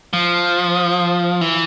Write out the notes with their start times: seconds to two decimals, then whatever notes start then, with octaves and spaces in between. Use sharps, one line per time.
0.13 F3
1.41 E3